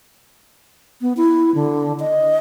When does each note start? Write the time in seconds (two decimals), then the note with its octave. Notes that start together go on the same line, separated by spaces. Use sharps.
1.02 B3
1.17 E4
1.55 D3
2.00 D#5